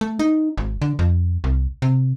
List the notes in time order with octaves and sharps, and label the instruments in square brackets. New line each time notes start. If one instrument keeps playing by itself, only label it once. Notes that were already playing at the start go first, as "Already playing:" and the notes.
[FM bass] A3
D#4
G#1
D3
F2
C2
C3